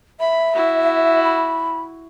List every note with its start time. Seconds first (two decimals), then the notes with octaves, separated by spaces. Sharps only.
0.20 E5 B5
0.55 E4 F#4
1.24 B5